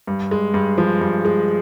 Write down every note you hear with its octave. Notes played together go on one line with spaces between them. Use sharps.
G2
G#3
G2
F3
G2
G#3